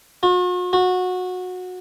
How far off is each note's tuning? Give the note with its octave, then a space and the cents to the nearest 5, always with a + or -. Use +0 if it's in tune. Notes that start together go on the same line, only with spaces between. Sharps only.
F#4 -45
F#4 -20